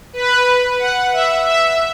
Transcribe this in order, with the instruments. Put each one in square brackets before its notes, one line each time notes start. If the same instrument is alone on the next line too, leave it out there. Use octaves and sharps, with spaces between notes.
[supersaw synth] B4
F#5
E5
E5